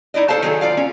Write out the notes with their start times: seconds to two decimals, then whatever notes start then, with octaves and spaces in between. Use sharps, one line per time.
0.14 D#4 E4 D5 D#5
0.28 A4 C5 C#5 F5 A5
0.42 D#3 F#3 G#4 A4
0.61 F4 D5 F5
0.77 C#4